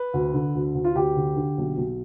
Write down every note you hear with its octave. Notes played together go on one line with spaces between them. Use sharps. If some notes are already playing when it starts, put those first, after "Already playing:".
Already playing: B4
D2
D3
D2
D2
F4
D2 G4
D3
D3
B1
B1